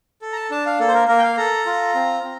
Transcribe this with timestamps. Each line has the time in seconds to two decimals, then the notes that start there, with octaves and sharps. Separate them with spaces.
0.22 A4
0.32 A#5
0.37 A5
0.51 D4 A5
0.66 F5
0.79 A#3 A4
0.88 C5
0.94 A#4
1.08 A#3 A#4
1.18 G5
1.23 F5
1.37 A4 A#5
1.66 F4
1.95 C4
2.23 C4